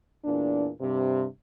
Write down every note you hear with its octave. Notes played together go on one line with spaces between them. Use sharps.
E2 A#2 D4
G2 C3